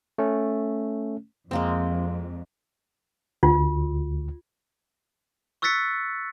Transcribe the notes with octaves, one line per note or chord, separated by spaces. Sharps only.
A3 C#4
F2 G#3 A#3 C4
D2 F4
C#6 E6 F#6 A6 B6 C#7